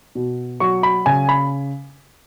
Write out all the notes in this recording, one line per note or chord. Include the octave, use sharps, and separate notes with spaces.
B2
F#3 C#6
B5
C#3 G#5
B5